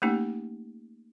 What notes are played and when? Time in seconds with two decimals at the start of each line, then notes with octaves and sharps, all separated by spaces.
0.02 A3 A#3 C#4 D#4 G4